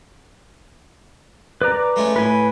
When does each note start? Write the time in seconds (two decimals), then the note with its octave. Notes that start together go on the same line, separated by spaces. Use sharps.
1.61 B4 D5 A#5
1.96 G#3 A3 C#4
2.16 A2 B4 G#5